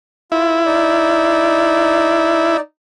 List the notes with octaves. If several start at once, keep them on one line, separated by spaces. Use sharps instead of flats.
E4 F4
D#4 D5